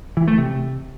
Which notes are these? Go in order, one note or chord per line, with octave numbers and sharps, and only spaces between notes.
E3
A3
C3